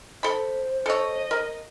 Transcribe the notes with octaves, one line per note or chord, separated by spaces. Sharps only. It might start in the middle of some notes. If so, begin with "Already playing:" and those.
A4 C5 B5
A4 C#5 D#5
A#4